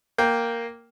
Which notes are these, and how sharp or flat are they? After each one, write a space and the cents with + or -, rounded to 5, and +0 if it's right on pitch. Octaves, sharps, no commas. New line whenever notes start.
A#3 +0 G5 +0